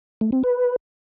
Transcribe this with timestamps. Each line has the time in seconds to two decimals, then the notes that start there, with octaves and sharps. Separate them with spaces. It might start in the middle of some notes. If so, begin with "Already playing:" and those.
0.21 A3
0.32 C4
0.44 B4